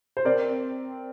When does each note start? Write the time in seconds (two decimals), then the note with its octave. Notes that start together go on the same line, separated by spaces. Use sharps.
0.17 C5
0.25 C4 A#4 D5